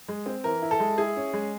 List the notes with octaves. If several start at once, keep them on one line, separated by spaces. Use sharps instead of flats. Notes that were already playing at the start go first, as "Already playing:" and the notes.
G#3
C4
E3 A#4
E4
A4
G#3
E4 G#4
C#4
G#3